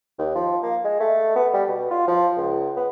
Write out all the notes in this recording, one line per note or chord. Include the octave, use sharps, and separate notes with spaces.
D#2
F3
A#3
G#3
A3
B3
G3
B2
F4
F3
C#2
B3